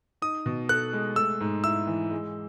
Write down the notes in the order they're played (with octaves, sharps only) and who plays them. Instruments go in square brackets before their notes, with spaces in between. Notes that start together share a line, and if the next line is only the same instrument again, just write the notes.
[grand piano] D#4 [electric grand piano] D#6
[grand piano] B2
[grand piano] A4 [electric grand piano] F#6
[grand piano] G#3
[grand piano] A3 [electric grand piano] E6
[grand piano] G#2
[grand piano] E4 [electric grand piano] E6
[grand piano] E3
G#3